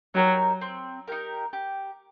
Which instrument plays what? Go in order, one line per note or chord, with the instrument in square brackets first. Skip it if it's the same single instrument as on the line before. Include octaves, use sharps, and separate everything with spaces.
[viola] F#3 [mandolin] D#4 G4 A#4
[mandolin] C4
D#4 G4 A#4
G4